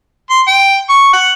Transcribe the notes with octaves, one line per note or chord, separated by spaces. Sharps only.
C6
G5
C#6
F#5